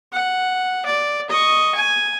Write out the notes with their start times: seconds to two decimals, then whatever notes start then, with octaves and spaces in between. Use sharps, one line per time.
0.12 F#5
0.85 D5
1.30 D#5 C#6
1.75 G#5